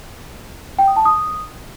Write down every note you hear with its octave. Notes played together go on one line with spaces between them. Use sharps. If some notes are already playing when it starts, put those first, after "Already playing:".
G5
D#6
A5
D#6